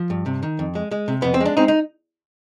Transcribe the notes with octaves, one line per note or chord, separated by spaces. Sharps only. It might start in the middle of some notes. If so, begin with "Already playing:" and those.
Already playing: F3
G2
C3
D#3
F2
G#3
G#3
C3
F2 B3
C4
G#3
D4
G#3 C4 D#4
D#4